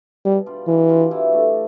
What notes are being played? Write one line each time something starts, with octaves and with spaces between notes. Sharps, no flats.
B2 G3
G3 D4 F4
B2 E3
G3 D4 F4
E3
A3 D4